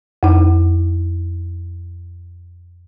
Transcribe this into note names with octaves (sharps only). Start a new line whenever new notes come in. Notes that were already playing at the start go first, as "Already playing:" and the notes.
F2 D#4